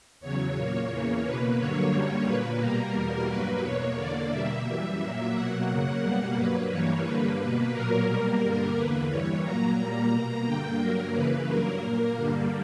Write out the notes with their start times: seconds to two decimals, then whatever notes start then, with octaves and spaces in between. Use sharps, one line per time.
0.20 E2 C#3 F#3 C#5
0.55 A#2 A#3
0.89 E2 C#3 E3 A#3
1.23 B2 A#3 B4
1.57 G2 D3 F#3 A#3 C#5
1.91 F#2 D3 G3 A#3
2.25 A#2 A#3 B4
2.60 B2 G3 A#3 A#4
2.94 E2 B2 G3 A#3
3.28 G2 F#3 A#3 B4
3.62 E2 B2 A#3 C#5
3.96 E2 D3 A#3 D5
4.30 B2 G3 A#3 E5
4.65 F#2 E3 G3
4.99 A#2 F#3 A#3
5.33 B2 F#3 A#3 F#5
5.67 F#2 C#3 F#3 A#3
6.01 B2 G3 A#3 F#5
6.35 G2 F#3 A#3 B4
6.70 G2 E3 G3 A#3 C#5
7.04 G2 D3 G3 A#3 B4
7.38 B2 A#3 B4
7.72 A#2 F#3 A#3 A#4
8.06 B2 G3 A#3
8.40 G2 D3 G3 A#3 A#4
8.75 E2 D3 A#3 B4
9.09 G2 E3 G3 C#5
9.43 A#2 F#3 A#3 A#5
9.77 A#2 G3 A#3
10.11 B2 A#3
10.45 G2 D3 A#3 G5
10.79 G2 F#3 A#3 A#4
11.14 F#2 C#3 E3 A#3 B4
11.48 G2 F#3 A#3 A#4
11.82 A#2 A#3
12.16 G2 D3 G3 A#3